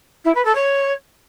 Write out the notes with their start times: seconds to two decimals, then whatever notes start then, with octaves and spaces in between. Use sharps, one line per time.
0.24 E4
0.34 B4
0.45 A4
0.55 C#5